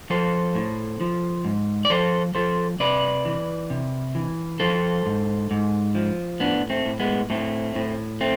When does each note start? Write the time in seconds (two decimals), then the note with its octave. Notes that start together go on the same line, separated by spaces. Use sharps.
0.10 F3 A4 C5
0.55 A2
1.01 F3
1.45 G#2
1.85 D5
1.90 F3 A4 C5
2.35 F3 A4 C5
2.80 C3 B4 D5
3.25 E3
3.70 C3
4.15 E3
4.60 F3 A4 C5
5.06 G#2
5.51 G#2
5.95 F3
6.40 A2 B3 D4
6.70 A3 C4
6.85 A2
7.00 G#3 B3
7.30 A2 A3 C4
7.75 A2
8.21 A3 C4